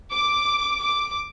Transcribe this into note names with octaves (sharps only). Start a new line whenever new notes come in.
D6
D6